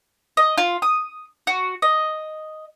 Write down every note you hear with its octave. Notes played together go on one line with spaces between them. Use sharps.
D#5
F4
D#6
F#4
D#5